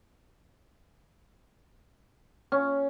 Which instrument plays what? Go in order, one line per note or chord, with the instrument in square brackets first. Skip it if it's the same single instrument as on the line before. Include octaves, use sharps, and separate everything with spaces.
[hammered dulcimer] C#4